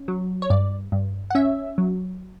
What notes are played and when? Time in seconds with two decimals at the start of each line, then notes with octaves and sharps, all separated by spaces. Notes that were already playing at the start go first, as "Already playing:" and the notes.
Already playing: C#4
0.08 F#3
0.42 C#5
0.50 G2 D5
0.92 G2
1.30 F#5
1.35 C#4 E5
1.78 F#3